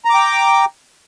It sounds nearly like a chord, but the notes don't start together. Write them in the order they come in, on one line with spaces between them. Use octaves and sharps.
A#5 D6 G5